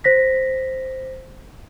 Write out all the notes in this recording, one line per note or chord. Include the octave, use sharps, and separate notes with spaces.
C5 A#6 B6